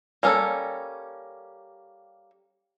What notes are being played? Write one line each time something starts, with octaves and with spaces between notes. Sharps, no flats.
G3 A#3 C#4 G#4 A4